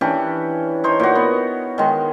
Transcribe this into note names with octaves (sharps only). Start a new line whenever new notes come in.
E3 C#4 D4 G4
D#4 C5 C#5
A#2 F#4
B3
D#3 G#3